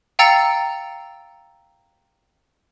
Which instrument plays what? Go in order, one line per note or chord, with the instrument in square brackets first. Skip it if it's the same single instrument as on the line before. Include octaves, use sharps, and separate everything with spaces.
[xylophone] F5 G5 A#5 E6 A6 C#7